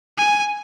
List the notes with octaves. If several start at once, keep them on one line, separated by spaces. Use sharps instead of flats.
G#5